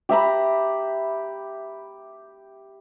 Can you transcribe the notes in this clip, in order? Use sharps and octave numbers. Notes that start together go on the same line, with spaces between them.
G4 E5 A#5 B5